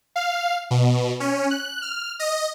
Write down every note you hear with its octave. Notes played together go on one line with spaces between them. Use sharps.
F5
B2
C#4
F#6
F6
D#5